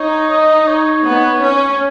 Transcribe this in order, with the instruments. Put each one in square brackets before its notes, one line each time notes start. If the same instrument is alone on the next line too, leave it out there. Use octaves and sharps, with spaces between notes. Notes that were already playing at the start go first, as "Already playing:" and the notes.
Already playing: [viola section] D#4 [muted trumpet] C#5
[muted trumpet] D#5
C#5
[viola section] B3
C#4